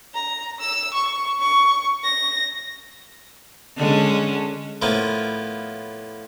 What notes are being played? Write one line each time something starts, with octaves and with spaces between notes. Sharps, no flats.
A#5
E6
C#6
C#6
A#6
D3 G#3 C#4
A2 F3 A#3 B3